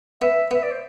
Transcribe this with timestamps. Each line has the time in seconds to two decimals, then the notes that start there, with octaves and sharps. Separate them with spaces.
0.22 B3 E5
0.51 B3 E5
0.63 D5
0.71 C5